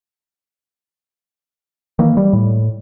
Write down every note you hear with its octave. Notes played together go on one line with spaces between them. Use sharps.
D#3 E3 A#3
G3
A2